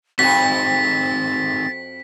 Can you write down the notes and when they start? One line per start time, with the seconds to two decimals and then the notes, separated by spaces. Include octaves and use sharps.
0.19 F2 C4 D#4 F#4 G#4 A6 B6